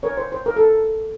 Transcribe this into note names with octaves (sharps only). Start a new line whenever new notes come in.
A#4 C#5
C5
C5
A#4
A4